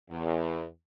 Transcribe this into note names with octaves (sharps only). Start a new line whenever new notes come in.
E2